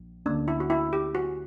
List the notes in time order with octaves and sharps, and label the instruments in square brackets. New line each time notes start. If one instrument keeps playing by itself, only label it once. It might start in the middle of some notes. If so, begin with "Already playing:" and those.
Already playing: [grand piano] A#1
[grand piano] D2 D3 A#3 C#4 [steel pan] D4
[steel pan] E4
F#4
E4
G4
F#4